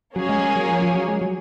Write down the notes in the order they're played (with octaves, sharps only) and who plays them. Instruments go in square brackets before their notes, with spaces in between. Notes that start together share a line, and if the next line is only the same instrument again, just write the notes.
[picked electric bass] F#3 [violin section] A#3 C#4 G#4 C#5
[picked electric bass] G#3
G#3
F#3
F3
F3
F#3
G#3
F#3